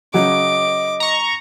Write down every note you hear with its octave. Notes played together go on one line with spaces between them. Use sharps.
C#3 F#3 D#5 D6
A#5 C#6